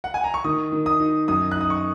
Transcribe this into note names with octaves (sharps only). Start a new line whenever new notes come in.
F#5
G#5
A#5
C#6
D#3 D#6
D#3
D#6
D#4
F#2 D#6
F#6
D#4 D#6
C#6